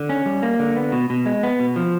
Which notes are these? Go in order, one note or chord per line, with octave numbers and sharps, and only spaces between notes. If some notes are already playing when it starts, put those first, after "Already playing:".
Already playing: D3
C#4
G3
A#3
D3
B3
B2
B2
G#3
B3
B2
F3